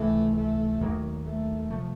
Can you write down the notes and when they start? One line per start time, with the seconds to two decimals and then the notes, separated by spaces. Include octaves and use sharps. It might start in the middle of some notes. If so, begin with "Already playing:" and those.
Already playing: C#2 C3 E3 A3
0.36 A3
0.81 D#2 D#3 F#3 A#3
1.25 A3
1.70 C3 F3 A3